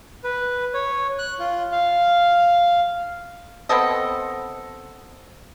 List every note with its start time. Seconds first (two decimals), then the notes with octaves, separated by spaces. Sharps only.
0.24 B4
0.74 C#5
1.19 F#6
1.39 F4
1.72 F5
3.69 B3 C4 A4 D#5